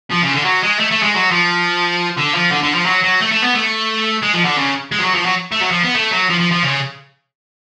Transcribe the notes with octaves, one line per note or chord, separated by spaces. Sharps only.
F3
C#3
D3
F#3
G#3
A3
A3
G#3
F#3
F3
D3
F3
D3
D3
F3
F#3
F#3
A3
A3
B3
A3
G#3
F3
D3
C#3
G#3
F3
F#3
F3
F#3
A3
F#3
F3
B3
A3
F#3
F3
F3
F3
C#3